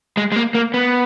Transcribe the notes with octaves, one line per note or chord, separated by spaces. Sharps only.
G#3
G#3
A#3
A#3
B3